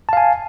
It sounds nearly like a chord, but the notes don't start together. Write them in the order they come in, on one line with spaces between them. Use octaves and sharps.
A5 F5 G#5